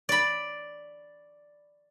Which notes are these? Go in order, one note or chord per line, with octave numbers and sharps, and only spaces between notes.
D5 B5